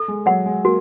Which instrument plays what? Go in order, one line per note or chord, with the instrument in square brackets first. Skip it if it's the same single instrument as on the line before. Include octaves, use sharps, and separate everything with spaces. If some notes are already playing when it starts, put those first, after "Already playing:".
Already playing: [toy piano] A4
[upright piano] G#3
[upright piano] F#3 [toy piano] F#5
[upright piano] G#3
[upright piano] A#3 [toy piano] F#4